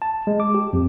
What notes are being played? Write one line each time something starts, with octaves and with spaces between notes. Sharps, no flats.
A5
G#3
D6
G4
F2